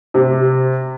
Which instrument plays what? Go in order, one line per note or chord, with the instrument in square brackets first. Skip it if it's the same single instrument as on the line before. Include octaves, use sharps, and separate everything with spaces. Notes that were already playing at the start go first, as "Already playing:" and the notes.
[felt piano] C3